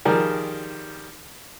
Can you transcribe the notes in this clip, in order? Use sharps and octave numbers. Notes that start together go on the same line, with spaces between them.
D#3 F3 G3 G#4 A#4